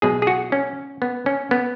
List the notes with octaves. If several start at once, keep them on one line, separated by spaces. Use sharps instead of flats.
B1 B2 G#3 G#4
G#4
F#4
C#4
B3
C#4
B3